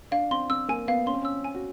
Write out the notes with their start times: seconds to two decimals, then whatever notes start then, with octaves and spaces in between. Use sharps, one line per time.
0.11 D4 F5
0.31 C4 C6
0.50 C4 E6
0.69 A#3 G#5
0.88 B3 F5
1.06 C#4 C6
1.14 C4
1.22 C#4 E6
1.44 G#5
1.55 F#4